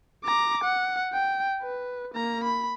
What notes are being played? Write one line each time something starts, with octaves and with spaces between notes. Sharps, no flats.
A#5 D6
F#5
G5
B4
A#3 A#5
B5